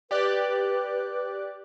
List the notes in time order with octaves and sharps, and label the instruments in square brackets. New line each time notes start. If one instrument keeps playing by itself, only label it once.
[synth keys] G4 D5 F#6 [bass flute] B4